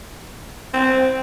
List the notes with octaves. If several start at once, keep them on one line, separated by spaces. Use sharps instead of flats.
C4